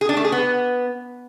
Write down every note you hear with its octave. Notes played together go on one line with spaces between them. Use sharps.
G#4
D4
A3
G#4
B3